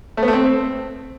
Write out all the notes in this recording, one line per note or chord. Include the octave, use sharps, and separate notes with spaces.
A3
B3
A3
C4